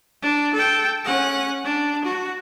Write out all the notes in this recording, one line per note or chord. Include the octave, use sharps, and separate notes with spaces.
D4
A4 G5
C#4 F#5
D4
F#4